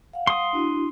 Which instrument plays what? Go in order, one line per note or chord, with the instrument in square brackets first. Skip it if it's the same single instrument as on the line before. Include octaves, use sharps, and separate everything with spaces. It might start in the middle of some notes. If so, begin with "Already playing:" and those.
[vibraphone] F5 F#5
[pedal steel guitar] C6 D#6
[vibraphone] D4 E4 F#4